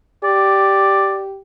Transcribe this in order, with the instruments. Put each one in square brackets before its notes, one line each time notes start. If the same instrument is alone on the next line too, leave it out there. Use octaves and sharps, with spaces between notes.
[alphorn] G4 [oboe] D5